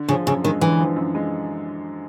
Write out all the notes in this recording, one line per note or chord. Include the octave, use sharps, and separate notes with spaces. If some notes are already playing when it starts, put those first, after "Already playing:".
Already playing: D3
C#3 F3
F#2 C#3
D#3 G#3
D3 E3
F3
F#2
G#3